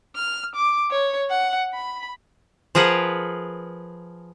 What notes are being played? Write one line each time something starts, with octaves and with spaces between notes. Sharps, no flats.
F6
D6
C#5
F#5
B5
F3 G#4 A#4 B4 F#5